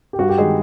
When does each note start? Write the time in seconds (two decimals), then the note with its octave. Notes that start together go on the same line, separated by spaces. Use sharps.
0.13 G4
0.19 G2 F#4
0.29 G4
0.38 D#3 G#3 G#4